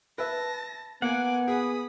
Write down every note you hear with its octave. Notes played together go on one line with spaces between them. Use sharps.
B4 E5 A5 A#6
A#3 B3 F#5 G#5 D6
G#4 B5 D#6